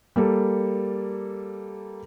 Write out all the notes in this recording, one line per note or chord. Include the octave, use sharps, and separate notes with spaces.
G3 A#3 A4